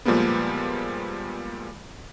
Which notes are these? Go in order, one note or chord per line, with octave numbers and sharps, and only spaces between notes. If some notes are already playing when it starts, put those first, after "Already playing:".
A#2 F3 G3 G#3 A#3 B3